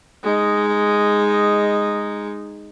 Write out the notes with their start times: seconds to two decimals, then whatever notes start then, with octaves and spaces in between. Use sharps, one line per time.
0.23 G#3 D#4